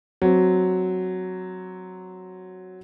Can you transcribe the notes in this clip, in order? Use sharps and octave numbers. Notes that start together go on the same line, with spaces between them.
F#3 C4